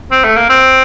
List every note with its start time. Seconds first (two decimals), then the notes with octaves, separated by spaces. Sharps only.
0.11 C4
0.24 A3
0.37 A#3
0.50 C4